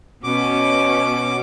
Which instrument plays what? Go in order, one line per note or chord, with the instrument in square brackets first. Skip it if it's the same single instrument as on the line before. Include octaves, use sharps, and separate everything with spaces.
[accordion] B2 D6 [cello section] B3 C#4 F#4